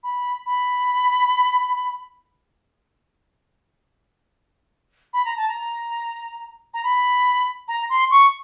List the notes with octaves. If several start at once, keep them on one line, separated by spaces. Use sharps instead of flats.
B5
B5
B5
A#5
A5
A#5
A#5
B5
A#5
C6
C#6